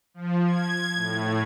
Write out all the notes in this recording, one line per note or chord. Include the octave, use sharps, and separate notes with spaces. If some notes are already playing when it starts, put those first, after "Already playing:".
F3
G#6
A2